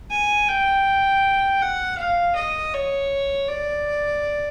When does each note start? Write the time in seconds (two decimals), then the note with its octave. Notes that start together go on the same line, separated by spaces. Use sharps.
0.10 G#5
0.48 G5
1.61 F#5
1.98 F5
2.36 D#5
2.74 C#5
3.48 D5